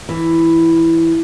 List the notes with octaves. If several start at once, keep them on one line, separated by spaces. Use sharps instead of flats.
E3